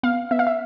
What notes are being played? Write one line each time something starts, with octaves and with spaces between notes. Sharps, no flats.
B3 F5
B3 E5
F5
E5